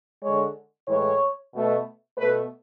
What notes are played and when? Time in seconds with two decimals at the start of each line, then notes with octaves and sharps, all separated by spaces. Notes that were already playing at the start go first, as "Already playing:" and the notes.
0.22 G#3 C#5
0.27 D3
0.88 A2 E3 G#3 C#5
1.52 B2 A3
2.18 B2 A3 B4